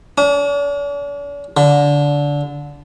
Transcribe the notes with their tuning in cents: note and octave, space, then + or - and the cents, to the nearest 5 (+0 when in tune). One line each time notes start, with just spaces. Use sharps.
D4 -45
D3 -20